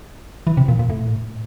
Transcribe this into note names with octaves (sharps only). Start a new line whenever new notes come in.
E3
C3
A#2
A#2
A2